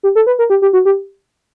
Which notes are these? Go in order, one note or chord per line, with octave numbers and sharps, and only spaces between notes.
G4
A4
B4
A#4
G4
G4
F#4
G4